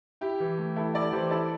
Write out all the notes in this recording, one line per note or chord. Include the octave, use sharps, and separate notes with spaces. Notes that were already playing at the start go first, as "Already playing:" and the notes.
E4 G4
E3
A3
E3 E4 A4
E4 A4 D5
E3 G4 C5
E4 A4 D5